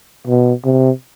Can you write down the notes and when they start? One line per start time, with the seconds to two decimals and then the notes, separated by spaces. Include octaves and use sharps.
0.27 B2
0.65 C3